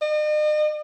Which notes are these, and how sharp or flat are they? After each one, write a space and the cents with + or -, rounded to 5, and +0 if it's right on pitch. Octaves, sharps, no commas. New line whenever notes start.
D#5 -45